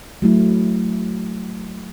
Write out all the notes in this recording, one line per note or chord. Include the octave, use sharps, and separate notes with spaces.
F#3 A3 E4